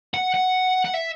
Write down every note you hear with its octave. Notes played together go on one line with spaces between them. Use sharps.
F#5
F#5
F#5
E5